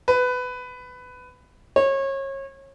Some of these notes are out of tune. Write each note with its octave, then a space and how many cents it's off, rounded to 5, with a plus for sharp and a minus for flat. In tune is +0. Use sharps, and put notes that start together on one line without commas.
B4 +15
C#5 -30